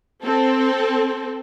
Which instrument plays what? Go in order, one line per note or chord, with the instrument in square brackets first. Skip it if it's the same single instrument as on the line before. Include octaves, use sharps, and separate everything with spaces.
[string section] C4 A4